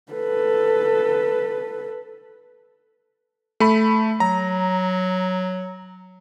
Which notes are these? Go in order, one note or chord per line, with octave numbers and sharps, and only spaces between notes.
A4 B4
A3 B5
F#3 A#5